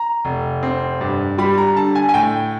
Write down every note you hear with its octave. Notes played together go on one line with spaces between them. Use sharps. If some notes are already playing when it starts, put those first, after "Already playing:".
Already playing: A#5
F1
C4
G2
G3 B5
A#5
D3 A5
G#5
G#5
A2 G5